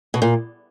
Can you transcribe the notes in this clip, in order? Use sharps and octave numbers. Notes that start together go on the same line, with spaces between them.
B2
A#2